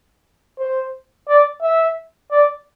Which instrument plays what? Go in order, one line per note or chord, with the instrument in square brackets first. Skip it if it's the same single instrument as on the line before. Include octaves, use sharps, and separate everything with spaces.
[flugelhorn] C5
D5
E5
D5